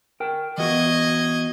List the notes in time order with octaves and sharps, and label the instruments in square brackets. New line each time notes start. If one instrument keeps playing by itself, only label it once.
[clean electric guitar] A#4 G5
[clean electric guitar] E3 B3 F#4 [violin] D#5 G#6